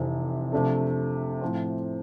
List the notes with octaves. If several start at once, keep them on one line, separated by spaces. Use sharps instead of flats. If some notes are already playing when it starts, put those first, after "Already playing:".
Already playing: F1 F2 C3 E3
C3 F3 A3 D4 A4
A2 F3 C4